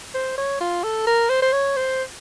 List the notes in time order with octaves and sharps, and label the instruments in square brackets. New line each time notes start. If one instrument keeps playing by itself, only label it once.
[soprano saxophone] C5
C#5
F4
A4
A#4
C5
C5
C#5
C5